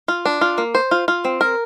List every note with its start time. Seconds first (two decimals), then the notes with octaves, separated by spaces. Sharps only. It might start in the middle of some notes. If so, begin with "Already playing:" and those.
0.08 F4
0.25 D4
0.41 F4
0.58 A#3
0.75 C5
0.91 F4
1.08 F4
1.25 C4
1.41 A#4